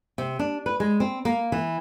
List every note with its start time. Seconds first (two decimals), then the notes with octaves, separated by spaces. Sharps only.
0.18 C3
0.39 D4
0.66 B4
0.80 G#3
1.00 C4
1.25 A#3
1.52 E3